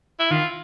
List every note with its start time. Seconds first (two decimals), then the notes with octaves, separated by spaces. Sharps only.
0.20 E4
0.31 D#3 F4